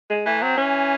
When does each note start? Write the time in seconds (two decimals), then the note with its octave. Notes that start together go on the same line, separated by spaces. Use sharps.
0.10 G#3
0.26 E3 A3
0.42 F#3 C4
0.58 E3 C#4